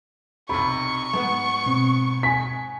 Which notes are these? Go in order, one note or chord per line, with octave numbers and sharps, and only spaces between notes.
B1 C3 B5 C#6
G#2 B3
B2 C4
G#5 B6